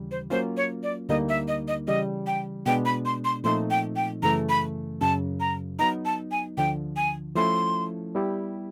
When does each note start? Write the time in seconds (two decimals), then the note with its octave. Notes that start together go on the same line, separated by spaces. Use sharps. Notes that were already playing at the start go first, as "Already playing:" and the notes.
Already playing: D#2 C#3 E3 G3
0.11 C5
0.30 F#3 A#3 C#4 F4 C5
0.57 C#5
0.83 D5
1.09 D2 D3 G3 A#3 D#4 D#5
1.29 E5
1.48 D#5
1.68 D#5
1.88 C#3 E3 G3 D#5
2.27 G5
2.66 B2 G#3 B3 D4 G5
2.85 B5
3.05 C6
3.25 C6
3.44 A#2 F3 A3 C4 D#4 C6
3.71 G5
3.96 G5
4.23 F#2 C#3 E3 A3 A#5
4.49 B5
5.01 F#2 C#3 F#3 A5
5.40 A#5
5.79 F#3 B3 D#4 A#5
6.05 A5
6.31 G#5
6.57 D2 D3 F3 G5
6.96 G#5
7.36 F3 A3 C#4 E4 A4 C6
8.15 G3 B3 E4 G4